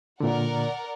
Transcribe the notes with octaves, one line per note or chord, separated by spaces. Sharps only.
A#2 D3 A#4 D5 F#5